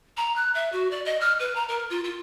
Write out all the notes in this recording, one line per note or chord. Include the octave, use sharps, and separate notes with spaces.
A#5
F#6
E5
F#4
D5
D#5
F6
B4
A#5
A#4
F4
F4